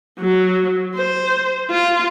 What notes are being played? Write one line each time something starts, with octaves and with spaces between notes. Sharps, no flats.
F#3
C5
F4